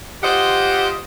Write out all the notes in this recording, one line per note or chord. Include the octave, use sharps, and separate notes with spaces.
F4 G4 C5 D#5 F#5